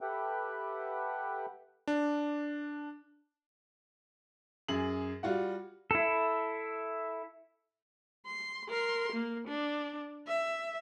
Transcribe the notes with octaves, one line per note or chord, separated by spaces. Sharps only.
G4 A4 B4 E5 F#5 G5
D4
F#2 G#4 F#7
G3 F4 F#4 F#5
E4 A4
C6
A#4 C6
A#3
D4
E5